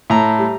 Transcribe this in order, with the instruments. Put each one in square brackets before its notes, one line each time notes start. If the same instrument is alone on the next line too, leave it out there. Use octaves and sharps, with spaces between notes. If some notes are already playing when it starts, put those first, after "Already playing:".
[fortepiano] A2 A#5
G3